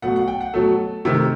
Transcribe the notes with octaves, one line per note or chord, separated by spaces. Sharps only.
B2 F#3 A3 F#5
F#5
G5
F#5
B2 F#3 A3 A4
C3 D#3 A3